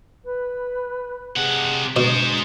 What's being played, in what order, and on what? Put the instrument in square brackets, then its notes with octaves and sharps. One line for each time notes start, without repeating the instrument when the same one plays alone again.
[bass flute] B4
[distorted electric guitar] C3 F#5 [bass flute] G#4
[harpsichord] B2 [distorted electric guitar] G#3 C5 [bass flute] D4